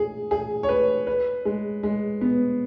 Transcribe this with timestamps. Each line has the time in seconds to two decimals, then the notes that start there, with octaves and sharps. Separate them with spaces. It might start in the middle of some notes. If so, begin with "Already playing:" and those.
Already playing: G#4
0.31 G#4
0.63 C#5
0.69 B4
1.07 B4
1.45 G#3
1.83 G#3
2.21 B3